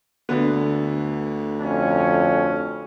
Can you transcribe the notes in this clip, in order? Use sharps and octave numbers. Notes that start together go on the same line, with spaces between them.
D2 D3 B3
F2 C#4